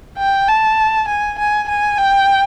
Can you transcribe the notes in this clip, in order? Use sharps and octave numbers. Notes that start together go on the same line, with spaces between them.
G5
A5
G#5
G#5
G#5
G5